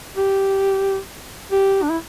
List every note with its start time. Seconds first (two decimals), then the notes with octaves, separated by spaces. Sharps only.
0.16 G4
1.51 G4
1.82 D4
1.89 E4